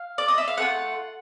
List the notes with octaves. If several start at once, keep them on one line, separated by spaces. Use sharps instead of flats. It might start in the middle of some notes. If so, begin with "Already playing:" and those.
Already playing: F5
D5
D#5
E5
F5
A3 D4 F4 F#5